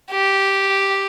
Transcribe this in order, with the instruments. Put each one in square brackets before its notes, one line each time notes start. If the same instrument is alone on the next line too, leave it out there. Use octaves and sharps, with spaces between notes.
[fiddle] G4